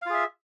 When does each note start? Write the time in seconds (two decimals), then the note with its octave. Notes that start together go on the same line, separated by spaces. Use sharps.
0.02 F5
0.06 F4
0.10 G#4
0.14 E5